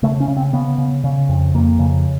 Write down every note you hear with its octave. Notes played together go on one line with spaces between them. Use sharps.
C#3 A3
C#4
C#3
C4
C#3 B3
C#3
C#3
F2
F2 A#3
C#3